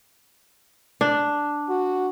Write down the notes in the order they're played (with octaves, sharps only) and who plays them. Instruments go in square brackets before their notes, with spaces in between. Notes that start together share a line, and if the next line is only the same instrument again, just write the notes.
[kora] D4
[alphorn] F#4